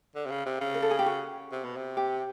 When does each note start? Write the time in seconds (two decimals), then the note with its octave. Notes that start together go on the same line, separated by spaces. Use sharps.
0.15 D3
0.26 C3
0.31 C#3
0.46 C3
0.61 C#3
0.74 A#4
0.82 A4
0.91 G#4
0.99 G4
1.06 F#4
1.52 C3
1.64 B2
1.76 C3
1.97 G4